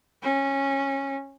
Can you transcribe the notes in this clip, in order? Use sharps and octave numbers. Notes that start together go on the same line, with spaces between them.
C#4